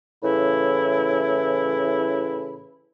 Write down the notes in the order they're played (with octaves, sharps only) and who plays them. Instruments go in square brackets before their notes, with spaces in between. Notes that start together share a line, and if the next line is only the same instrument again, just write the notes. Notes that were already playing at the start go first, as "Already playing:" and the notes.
[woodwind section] A2 C#3 E3 E4